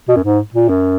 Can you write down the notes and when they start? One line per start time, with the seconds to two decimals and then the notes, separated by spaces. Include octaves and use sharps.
0.08 B2
0.16 F#2
0.24 G#2
0.54 A#2
0.69 F#2